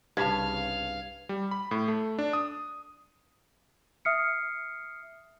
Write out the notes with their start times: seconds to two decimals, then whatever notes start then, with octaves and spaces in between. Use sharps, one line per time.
0.17 C2 G2 C#3 F5 A5 G#6
1.29 G3
1.51 B5
1.71 A2
1.88 A3
2.19 D4
2.33 D#6
4.05 E5 D#6 F6 C7 C#7